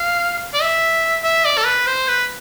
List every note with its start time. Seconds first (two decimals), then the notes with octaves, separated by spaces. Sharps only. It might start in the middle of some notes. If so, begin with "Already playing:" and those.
Already playing: F5
0.53 D5
0.62 E5
1.24 E5
1.45 D5
1.58 A4
1.66 B4
1.87 C5
2.08 B4